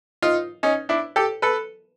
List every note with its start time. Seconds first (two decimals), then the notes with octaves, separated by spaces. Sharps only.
0.22 D#4 F4
0.63 C#4 D#4
0.89 D4 E4
1.16 G4 A4
1.42 A4 B4